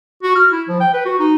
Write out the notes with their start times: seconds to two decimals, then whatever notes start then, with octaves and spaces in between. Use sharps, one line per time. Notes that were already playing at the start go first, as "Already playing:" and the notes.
0.23 F#4
0.36 F6
0.52 E4
0.69 F3
0.80 G5
0.94 B4
1.05 F#4
1.19 D#4